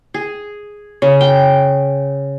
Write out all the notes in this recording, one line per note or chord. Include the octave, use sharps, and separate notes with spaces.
G#4
C#3
G5